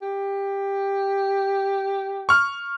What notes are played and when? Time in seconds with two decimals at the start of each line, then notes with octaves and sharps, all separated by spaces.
0.02 G4
2.29 C#6 F6